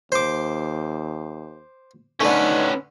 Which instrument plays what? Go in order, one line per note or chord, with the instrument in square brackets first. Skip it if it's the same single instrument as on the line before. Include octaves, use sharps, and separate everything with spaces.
[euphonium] D#2 [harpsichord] C5 D6
[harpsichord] D3 A3 [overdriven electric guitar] C#4 B4 [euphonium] D#4